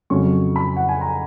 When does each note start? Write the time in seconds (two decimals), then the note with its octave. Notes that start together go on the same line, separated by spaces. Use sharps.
0.10 F2 C#3 F#3 C#4 C#6
0.56 B5
0.77 F#5
0.89 G#5
1.01 A#5